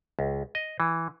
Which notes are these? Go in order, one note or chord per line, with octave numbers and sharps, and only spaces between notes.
C#2
D#5
E3